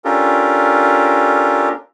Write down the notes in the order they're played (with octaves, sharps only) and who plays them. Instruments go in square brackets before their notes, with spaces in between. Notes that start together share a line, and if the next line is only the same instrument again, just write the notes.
[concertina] C#4 D4 F4 G4 A4 A#4